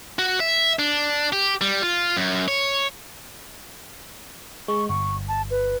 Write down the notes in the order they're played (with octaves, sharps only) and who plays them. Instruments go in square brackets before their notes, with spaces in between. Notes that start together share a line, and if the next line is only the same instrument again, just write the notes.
[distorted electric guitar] F#4
E5
D4
G4
G3
F4
F#2
C#5
[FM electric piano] G#3 [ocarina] C#6
[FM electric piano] G1 [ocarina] C#6
[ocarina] A5
B4